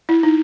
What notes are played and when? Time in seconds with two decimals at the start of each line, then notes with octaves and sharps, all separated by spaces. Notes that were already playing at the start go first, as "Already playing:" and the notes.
0.09 E4
0.23 D#4